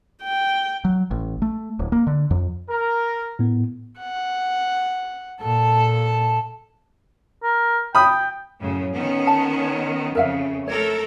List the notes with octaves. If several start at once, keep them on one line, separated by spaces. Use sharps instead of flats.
G5
F#3
A1
A3
D1
A#3
D3
F2
A#4
A2 B3
F#5
A#2 A4 A5
A#4
G5 B5 D#6
F#2 A2 C#3
D#3 B3 C#4
A5
C#5
F2 C#3 A#4 E5 F5
A3 A4 A#4 C#5